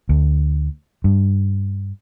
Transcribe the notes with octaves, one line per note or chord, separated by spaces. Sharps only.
D2
G2